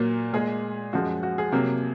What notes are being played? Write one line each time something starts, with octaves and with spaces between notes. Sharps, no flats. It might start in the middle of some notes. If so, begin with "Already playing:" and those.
Already playing: A#2 F#3 A#3
A#2 G#3 G#4
F#2 F3 G#3 F#4
F#4
G#4
C3 F#3 A#3